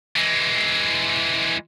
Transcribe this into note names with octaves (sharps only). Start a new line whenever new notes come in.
E3 G#3